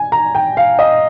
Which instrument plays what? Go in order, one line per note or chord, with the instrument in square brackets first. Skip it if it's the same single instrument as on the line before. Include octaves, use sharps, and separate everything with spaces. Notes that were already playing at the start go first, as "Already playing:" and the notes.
Already playing: [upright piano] G#5
A#5
G5
F5
D#5